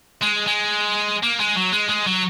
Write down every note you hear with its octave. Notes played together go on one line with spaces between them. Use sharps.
G#3
G#3
A#3
G#3
F#3
G#3
G#3
F#3